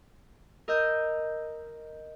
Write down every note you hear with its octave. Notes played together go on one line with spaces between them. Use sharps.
A#4 D#5 E6 G6